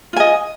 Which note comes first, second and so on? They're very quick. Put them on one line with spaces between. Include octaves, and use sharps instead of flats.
F4 G#5 D#5